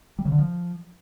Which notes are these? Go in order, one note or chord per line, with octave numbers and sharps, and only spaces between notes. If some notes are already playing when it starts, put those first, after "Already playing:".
G3
C#3
D3
F3